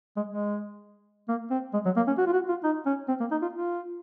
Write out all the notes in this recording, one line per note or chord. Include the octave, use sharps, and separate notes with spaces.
G#3
G#3
A#3
C4
G#3
F#3
A#3
C#4
F#4
F4
F#4
F4
D#4
C#4
C4
A#3
D#4
F4
F4